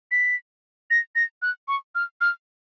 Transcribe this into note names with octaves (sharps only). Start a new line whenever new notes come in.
B6
A#6
A#6
F#6
C#6
F6
F6